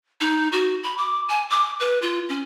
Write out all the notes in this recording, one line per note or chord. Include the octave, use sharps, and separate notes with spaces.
D#4
F#4
B5
D6
G#5
D6
B4
F4
C#4